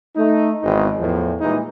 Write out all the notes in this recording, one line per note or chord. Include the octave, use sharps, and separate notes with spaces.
A3 D#4
G#1 E2 D#4
E2 A2 F3
A#2 E3 G3 G#3 A#3 D#4